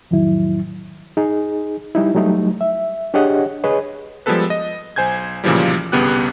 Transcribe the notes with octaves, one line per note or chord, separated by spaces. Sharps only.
F2 A2 D#3 F#3 E4
D#4 G#4
G3 D#4 E4
F#3 G3 A3 D#4
E5
D4 G4 G#4 C#5 D#5 F#5
G#4 B4 C#5 D#5
F3 G3 G#3 B3 A4 B4
D#5
B1 C5 G#5 G6 G#6
B1 A#2 C#3 E3 F3 G3
G1 C2 C#3 B3 G4 F#6